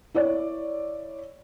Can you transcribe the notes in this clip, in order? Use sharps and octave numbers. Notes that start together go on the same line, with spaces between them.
E4 C#5 D5